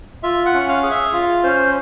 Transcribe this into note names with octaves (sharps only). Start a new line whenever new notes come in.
F4 E5
F#5
C#4
F5
G#4
E5
F4 F5
C#4 C5